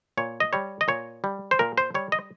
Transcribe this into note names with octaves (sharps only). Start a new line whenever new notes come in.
A#2 C#5
D#5
G3 C#5
D#5
A#2 C#5
G3
C5
A#2 A#4
C5
G3 C#5
D#5